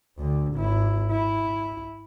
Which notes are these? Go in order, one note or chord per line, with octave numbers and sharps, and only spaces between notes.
D2 D3
G#1 E4
E4